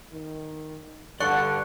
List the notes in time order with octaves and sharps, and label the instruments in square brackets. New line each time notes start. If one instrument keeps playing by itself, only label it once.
[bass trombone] D#3
[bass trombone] G2 [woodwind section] D3 [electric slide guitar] D5 F#5 A5 [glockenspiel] C#6 F#6 C#7